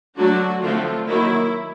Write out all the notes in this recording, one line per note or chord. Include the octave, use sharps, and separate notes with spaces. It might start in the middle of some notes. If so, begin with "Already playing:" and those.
D3 F#3 A3 D4 F#4
D3 F3 A3 C4 F4
D#3 F#3 A#3 E4